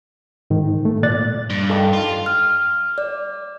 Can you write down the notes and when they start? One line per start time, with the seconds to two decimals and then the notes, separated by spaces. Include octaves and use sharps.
0.50 G#2 D#3
0.85 A3
1.03 A#2 D5 F#6 A6
1.50 G2
1.70 D#3 E3 A4
1.93 F4
2.26 F6
2.98 D5